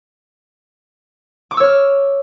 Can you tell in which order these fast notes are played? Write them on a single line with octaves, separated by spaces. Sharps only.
D6 C#6 E6 C#5 F6